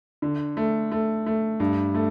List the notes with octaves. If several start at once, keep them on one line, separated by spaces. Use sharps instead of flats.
D3
A3
A3
A3
G2
A3